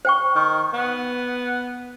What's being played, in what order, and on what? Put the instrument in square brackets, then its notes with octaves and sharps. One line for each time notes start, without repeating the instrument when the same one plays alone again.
[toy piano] C5 G5 C#6
[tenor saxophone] D#3
B3